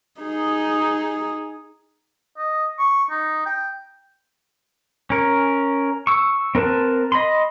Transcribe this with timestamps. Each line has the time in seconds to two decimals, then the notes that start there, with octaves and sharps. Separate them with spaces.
0.21 D#4 G#4
2.38 D#5
2.79 C#6
3.11 D#4
3.46 G5
5.10 C#4 A#4
6.07 C#6 E6
6.55 C4 A#4 B4 A5
7.12 D#5 B5 C6